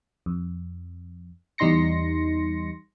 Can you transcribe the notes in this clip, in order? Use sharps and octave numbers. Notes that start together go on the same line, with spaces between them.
F2
E2 G3 D#4 C6 A#6 C#7